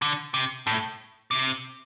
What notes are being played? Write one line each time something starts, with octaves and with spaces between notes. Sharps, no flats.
D3
C3
A2
C3